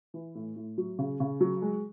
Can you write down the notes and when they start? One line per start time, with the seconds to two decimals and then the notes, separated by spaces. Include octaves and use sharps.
0.14 E3
0.35 A2
0.56 A2
0.78 F#3
0.99 C#3
1.20 C#3
1.40 F#3
1.62 G#3